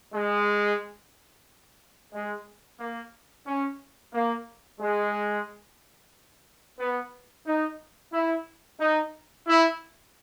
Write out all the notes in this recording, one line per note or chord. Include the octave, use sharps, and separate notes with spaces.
G#3
G#3
A#3
C#4
A#3
G#3
B3
D#4
E4
D#4
E4